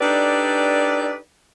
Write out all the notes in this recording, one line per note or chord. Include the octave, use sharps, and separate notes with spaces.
D4 D#4 G4 A4 B4 D5